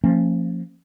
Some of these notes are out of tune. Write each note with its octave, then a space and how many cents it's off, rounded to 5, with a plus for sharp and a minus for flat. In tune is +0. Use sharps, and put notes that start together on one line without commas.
F3 +0 A#3 -35 C#4 -25